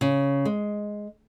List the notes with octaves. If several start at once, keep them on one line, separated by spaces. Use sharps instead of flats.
C#3
G#3